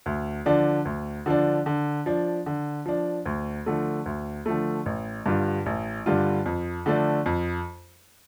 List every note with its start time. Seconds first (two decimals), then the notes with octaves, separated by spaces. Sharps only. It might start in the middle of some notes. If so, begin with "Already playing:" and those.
0.06 D2
0.46 D3 F3 D4
0.85 D2
1.26 D3 F3 D4
1.66 D3
2.06 F3 D4
2.46 D3
2.86 F3 D4
3.26 D2
3.66 D3 F3 A3
4.06 D2
4.46 D3 F3 A3
4.86 A1
5.26 G2 D3 G3 F4
5.66 A1
6.06 G2 D3 G3 F4
6.46 F2
6.86 D3 F3 A3 D4
7.26 F2